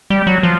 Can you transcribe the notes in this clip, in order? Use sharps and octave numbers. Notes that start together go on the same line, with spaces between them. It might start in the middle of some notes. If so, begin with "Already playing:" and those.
G3
F#3
F3